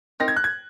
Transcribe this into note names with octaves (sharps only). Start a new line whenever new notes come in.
C4 D#4 A#4 D#5 A#6
G#6
F#6
G#6